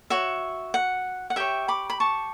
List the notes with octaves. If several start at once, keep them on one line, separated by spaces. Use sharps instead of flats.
F#4 C#5 E5
F#5
F#5
G4 C#5 E5 G5
B5 D6
B5
A5 C#6